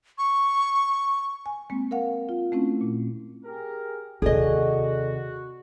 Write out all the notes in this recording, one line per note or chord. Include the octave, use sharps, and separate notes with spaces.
C#6
G#5
G#3 A#3 C4
A#4 F5 F#5
F4
A3 C4 C#4 E4
A#2
G4 G#4 A#4
D#2 C3 F#4 G#4 A4 D5 D#5